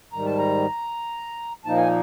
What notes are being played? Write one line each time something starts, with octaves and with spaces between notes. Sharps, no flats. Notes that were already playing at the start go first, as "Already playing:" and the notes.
G#2 D#3 G3 A#5
A5
A#5
A#2 F3 A#3 D#4 A5
G#5